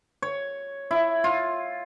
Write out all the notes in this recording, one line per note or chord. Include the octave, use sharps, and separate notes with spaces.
C#5
E4
F4